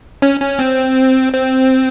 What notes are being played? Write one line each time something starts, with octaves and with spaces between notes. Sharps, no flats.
C#4
C#4
C4
C4